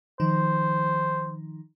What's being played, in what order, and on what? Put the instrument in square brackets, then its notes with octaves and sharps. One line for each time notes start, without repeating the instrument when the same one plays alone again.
[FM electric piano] D#3 F3 D#4 [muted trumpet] C5